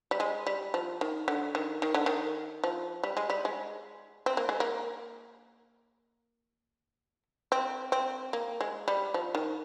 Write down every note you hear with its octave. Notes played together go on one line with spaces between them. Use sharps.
G3
G#3
G3
F3
D#3
D3
D#3
D#3
D3
D#3
F3
G3
G#3
G3
G#3
C4
A#3
G#3
A#3
C4
C4
A#3
G#3
G3
F3
D#3